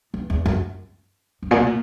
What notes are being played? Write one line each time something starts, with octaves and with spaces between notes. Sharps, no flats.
G2
E2
F#2
G2
A#2
B2
A#2